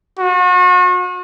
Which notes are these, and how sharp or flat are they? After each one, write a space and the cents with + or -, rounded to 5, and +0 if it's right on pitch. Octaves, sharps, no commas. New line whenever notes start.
F#4 -40